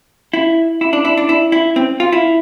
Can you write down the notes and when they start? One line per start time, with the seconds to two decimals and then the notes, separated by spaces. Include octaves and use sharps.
0.33 E4
0.81 E4
0.93 D4
1.05 E4
1.18 D4
1.29 E4
1.52 E4
1.76 C4
2.00 F4
2.12 E4